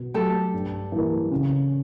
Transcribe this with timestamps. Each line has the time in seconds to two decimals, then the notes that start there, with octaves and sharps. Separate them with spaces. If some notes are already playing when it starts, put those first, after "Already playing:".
Already playing: B2
0.14 F#3 A3 G4 A4
0.53 G2
0.92 E3 G3 A#3
1.31 C#3